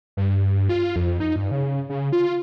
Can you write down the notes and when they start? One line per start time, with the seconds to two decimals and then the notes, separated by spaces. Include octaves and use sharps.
0.17 G2
0.69 F4
0.96 F2
1.20 D#4
1.36 G2
1.51 C#3
1.89 C#3
2.13 F4